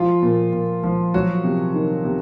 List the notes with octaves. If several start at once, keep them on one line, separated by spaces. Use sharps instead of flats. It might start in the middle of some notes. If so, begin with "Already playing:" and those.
Already playing: F3 F4
A#2
A#2
F3
F#3 F#4
C3
D#3
C3